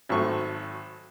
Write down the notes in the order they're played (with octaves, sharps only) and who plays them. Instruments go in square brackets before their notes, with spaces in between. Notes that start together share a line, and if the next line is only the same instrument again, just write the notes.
[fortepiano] G#1 F#3 A3 C#6